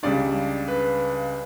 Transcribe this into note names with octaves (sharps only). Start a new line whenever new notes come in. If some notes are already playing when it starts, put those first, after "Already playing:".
C#2 C#3 G3 D4 D5
B4